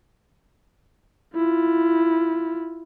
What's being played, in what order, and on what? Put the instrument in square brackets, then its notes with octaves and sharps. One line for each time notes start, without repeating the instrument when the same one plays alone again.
[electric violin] E4 F4